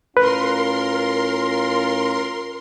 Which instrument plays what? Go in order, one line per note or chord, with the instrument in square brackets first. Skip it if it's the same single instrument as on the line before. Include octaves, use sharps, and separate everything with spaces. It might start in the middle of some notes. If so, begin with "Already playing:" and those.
[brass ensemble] A2 C#4 F4 [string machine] A#4 C6 [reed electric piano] B4